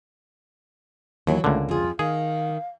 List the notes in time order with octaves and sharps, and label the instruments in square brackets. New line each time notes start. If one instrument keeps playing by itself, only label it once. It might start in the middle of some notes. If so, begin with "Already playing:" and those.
[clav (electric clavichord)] D#2 [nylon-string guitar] E3 F#3
[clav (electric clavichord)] C#2 D3 [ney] A3 [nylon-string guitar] A#3
[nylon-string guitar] F2 G#4 [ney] F4
[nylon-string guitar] D#3 [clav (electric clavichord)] G#4 [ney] F5